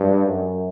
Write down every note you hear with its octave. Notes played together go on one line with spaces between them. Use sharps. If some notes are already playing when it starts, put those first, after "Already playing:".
Already playing: G2
F#2